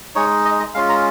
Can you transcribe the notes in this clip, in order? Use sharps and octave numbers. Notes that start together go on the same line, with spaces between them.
G#3 D#4 C#5
D#5
D#5
G#3 C#4 F4 F5
A#5